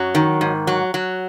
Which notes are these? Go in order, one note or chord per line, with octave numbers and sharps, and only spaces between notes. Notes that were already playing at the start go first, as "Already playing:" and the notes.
Already playing: F#2 F#3
D#3
G#2
F#3
F#3